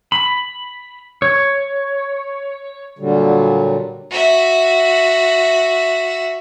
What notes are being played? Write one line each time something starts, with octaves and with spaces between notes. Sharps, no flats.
B5
C#5
A#2 D3 F#3 G3
F#4 E5